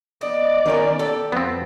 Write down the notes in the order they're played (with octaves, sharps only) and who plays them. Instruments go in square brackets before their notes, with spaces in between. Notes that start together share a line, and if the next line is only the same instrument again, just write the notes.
[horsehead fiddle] B3 D5 [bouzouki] D#5
[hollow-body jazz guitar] D#3 C#4 A#4
[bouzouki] G4 [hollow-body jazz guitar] A4
[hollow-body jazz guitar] F2 [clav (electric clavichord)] B3 C4